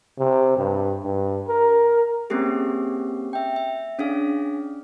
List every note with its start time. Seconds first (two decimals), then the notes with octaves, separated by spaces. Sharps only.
0.19 C3
0.57 G2
1.04 G2
1.48 A#4
2.30 A#3 C4 C#4 G4 G#4
3.33 E5 G5
3.56 E5
3.99 C#4 D4 G#4 F5